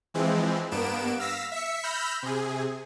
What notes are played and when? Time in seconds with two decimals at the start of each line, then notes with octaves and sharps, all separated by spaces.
0.14 E3 F3 G#3 C4
0.71 G2 A#3 B3 D7 E7
1.19 F5 E6 A#6 B6
1.52 E5 B6 C#7
1.83 B5 E6 F6 G6 A#6
2.23 C3 G#4